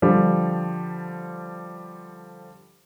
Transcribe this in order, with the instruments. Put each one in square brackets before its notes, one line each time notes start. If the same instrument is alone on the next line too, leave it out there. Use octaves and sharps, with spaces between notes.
[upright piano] D3 F3 G3